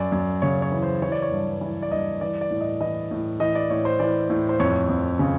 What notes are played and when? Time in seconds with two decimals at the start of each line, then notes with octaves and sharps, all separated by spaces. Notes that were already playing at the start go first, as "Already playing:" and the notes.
Already playing: F#2 D5
0.12 F#2
0.42 C#3 C#5
0.62 C#5
0.72 E3
0.82 C5
1.02 E3 C#5
1.12 D5
1.22 C#5
1.31 G2
1.61 E3
1.82 D5
1.91 G2 D#5
2.21 E3 D5
2.41 D5
2.51 A2
2.61 D#5
2.81 E3 D#5
3.11 A2
3.40 E3 D#5
3.55 D5
3.70 A2 C#5
3.85 C5
3.99 E3 D5
4.30 A2
4.49 C5
4.60 F2 C#5
4.89 F2
5.19 C#3